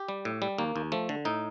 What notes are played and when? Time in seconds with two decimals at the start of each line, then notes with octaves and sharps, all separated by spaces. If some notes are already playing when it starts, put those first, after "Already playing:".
Already playing: G4
0.09 G3
0.25 A2
0.42 G3
0.58 D#2 A#3
0.76 D#2
0.92 F3 A3
1.09 D3
1.25 A2 D#4